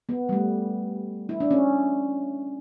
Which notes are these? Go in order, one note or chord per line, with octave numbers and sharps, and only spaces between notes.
B3
G3
A3
E4
D4
C#4